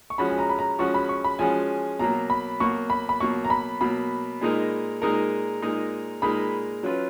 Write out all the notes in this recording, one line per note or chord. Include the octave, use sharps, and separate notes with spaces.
C#6
F3 G#3 C#4 F#4 B5
G#5
A#5
B5
A#5
F3 G#3 C#4 F#4 C#6
B5
C#6
B5
F3 G#3 C#4 F#4 G#5
B2 F#3 A#3 A#5
B5
B2 F#3 A#3 C#6
B5
B5
B2 F#3 A#3 C#6
A#5
B5
B2 F#3 A#3 B5
A#2 G#3 D#4 A#4
A#2 G#3 D#4 A#4 A#5
A#2 G#3 D#4 A#4
A#2 G#3 D#4 A#4 B5
F#3 C#4 F4 B4